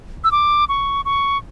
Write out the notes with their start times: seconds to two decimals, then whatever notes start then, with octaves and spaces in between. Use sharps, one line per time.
0.24 E6
0.32 D6
0.69 C#6
1.05 C#6